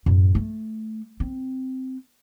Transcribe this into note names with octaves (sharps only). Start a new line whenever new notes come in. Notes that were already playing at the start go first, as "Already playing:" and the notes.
F#2 A2
A3
C4